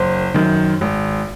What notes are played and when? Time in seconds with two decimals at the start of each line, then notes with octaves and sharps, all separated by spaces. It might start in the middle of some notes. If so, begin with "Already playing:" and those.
Already playing: F#1 C5
0.34 F#2 D#3
0.81 G#1